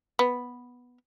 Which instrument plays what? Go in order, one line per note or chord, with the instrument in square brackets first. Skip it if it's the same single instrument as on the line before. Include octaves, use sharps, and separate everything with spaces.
[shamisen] B3